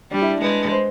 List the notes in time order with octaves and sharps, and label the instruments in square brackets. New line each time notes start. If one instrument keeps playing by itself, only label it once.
[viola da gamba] G3 [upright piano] D4
[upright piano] E4
[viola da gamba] G#3 [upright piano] B4
[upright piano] B4
C5